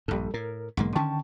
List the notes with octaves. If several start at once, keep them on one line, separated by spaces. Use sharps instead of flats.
A#1 G2 G3 A4
A2 A#4
B1 G#2 D3 E3 G#3 A#3
D3 D#3 C#4 G5 A5 C#6